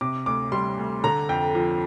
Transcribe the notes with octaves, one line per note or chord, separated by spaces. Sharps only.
C3 D6
D2 D6
G3 C6
D2
D3 A#5
F2 G5
F3